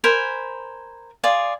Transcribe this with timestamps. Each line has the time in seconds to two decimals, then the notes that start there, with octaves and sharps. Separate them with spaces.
0.04 A#4 C5 G#5 B5
1.24 F4 G#4 D5